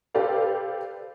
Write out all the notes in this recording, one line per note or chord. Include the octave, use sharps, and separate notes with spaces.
G4 A4 B4 C5 D5 F5